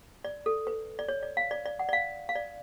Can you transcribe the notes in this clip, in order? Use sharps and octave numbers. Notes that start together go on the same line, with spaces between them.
D5
A4
B4
D5
C#5
D5
F5
D5
D5
F#5
D5
F5
F5
D5